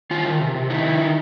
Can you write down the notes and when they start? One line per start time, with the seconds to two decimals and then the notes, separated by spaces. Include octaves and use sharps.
0.11 D#3 F4
0.25 D#3
0.41 C3
0.55 C3
0.70 D#3 E4
0.86 D#3
1.00 D#3